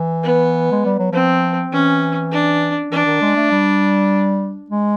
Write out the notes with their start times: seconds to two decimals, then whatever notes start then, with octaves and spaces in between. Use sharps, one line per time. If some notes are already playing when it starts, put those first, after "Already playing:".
Already playing: E3
0.23 B3
0.72 G#3
0.86 G3
0.99 F#3
1.12 F3 C4
1.72 E3 C#4
2.31 D4
2.92 E3 D4
3.06 D#3
3.21 G#3
3.36 A3
3.51 G3
4.70 G#3